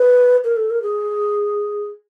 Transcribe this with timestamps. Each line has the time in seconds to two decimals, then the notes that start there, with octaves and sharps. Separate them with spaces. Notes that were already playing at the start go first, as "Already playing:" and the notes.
Already playing: B4
0.44 A#4
0.56 A4
0.70 A#4
0.82 G#4